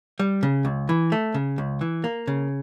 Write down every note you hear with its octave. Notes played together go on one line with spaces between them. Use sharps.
G3
C#3
C#2
E3
A3
C#3
C#2
E3
A#3
C#3